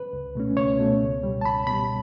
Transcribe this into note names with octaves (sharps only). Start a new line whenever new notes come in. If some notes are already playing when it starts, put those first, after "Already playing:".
Already playing: B4
C#2
B2 A3 C#4
C#2 C#5
B2 A3 C#4
C#2
B2 G3
A5
C#2 B5
B2 G3 B5